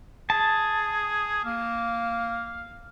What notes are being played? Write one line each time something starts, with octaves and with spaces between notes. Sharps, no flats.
G#4 A5
A#3 F5